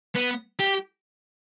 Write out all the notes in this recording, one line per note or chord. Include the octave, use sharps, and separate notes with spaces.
B3
G4